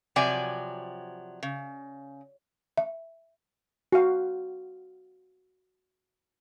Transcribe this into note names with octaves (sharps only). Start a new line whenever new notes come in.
C3 F3 F#3 D5 G#5
C#3
E5
F#4 F5